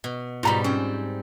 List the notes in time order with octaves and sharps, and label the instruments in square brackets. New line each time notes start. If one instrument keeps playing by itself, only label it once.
[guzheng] B2
[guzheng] G#2 B2 G3 [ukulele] F4 A#5 B5
[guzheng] C4 [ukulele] C#4 F4